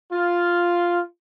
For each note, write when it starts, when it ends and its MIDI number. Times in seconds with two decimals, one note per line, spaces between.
0.12 1.01 65